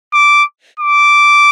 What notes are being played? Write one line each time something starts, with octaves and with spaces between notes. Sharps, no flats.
D6
D6